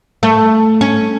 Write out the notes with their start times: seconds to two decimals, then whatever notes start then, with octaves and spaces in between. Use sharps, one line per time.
0.23 A3
0.81 C#4